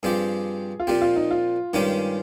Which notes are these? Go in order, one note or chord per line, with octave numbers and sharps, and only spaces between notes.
G2 F3 C4 G4 G#4
F4
A#2 F3 C4 G4
F4
D#4
F4
G2 D#3 G#3 C#4 G4